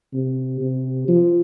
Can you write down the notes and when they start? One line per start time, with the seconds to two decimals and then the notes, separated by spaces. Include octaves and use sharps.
0.13 C3
0.60 C3
1.08 F3